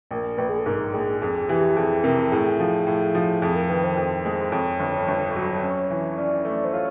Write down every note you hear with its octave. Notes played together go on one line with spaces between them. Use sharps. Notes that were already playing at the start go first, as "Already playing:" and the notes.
A#1 A#4
A#1 B4
G#4
A4
G#2 A#4
A#1 G#4
F2 G#4
E3 G4
F2 G#4
C3 A#4
A2 G#4
F3
A2
F3
F2 G#4
A#4
D#3 B4
C5
F2
G#3
F2 C#5
G1
G1
F#3
C#4
E3
C#4 D5
A3 D5
C5
F4 C#5